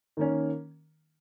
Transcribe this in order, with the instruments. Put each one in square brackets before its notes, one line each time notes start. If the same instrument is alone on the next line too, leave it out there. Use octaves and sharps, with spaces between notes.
[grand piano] D#3 A#3 C#4